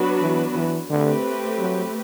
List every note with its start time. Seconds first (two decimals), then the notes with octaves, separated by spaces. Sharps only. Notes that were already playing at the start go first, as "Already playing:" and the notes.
Already playing: F#3 B3 D4 F#4 B4
0.21 E3
0.55 E3
0.90 D3 A3 C4 G4 B4
1.59 F#3